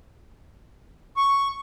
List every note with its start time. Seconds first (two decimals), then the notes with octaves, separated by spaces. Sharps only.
1.17 C#6